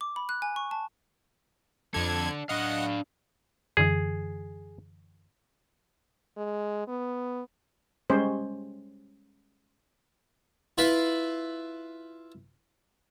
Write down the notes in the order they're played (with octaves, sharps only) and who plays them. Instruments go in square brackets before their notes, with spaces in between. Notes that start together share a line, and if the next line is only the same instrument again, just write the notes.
[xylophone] D6
B5
F#6
G#5
C#6
A5
[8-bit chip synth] F2 G#6 [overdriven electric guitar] D4 A4
[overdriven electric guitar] D4 F5 [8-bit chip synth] D#5 F#5
[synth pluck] F#2 D3 E3 [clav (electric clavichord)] G#4
[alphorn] G#3
B3
[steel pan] G3 G#3 C#4 C5
[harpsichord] E4 F4 B4 B5 C6